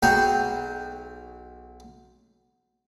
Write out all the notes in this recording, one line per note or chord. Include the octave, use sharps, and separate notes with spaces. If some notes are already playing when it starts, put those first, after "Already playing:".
B1 F#4 G#4 G5 A#5 B5